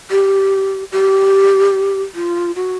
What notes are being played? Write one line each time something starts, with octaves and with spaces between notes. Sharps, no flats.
G4
G4
F4
F#4